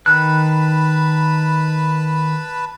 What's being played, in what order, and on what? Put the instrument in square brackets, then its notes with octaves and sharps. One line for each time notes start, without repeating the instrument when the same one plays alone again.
[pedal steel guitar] D#3 F#6 [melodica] B4 A5 B5